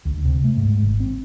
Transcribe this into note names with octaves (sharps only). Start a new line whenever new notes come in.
D2
C3
A3
G#2
G#1
C4